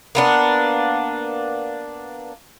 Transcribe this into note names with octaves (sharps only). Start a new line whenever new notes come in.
A#3 B3 D4